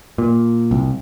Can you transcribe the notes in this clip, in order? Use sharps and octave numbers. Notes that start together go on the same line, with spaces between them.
A#2
C2